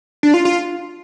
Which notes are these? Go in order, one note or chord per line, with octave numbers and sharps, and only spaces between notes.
D4
F4
F4